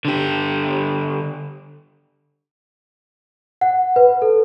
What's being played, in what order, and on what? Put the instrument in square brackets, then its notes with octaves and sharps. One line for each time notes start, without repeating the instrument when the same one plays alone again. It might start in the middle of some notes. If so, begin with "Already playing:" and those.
[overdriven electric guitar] D3 G4
[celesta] F#5
B4
A4